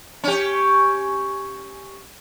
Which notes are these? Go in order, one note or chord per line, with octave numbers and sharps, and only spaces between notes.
C#4 G4